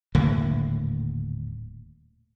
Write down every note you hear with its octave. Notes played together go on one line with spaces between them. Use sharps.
D#1 A2 D3 A#3